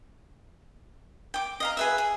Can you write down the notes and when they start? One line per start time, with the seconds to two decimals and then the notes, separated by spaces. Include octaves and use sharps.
1.34 G5 D6
1.60 D#5 F5 A#5
1.77 G#4 B4 E5
1.98 G#4